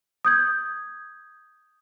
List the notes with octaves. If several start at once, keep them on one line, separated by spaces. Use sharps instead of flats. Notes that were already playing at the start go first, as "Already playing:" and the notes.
D#6 G6 G#6